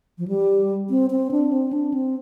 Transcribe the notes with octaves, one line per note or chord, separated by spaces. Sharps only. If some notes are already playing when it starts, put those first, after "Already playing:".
F3
G3
C4
C4
D4
C4
D4
C4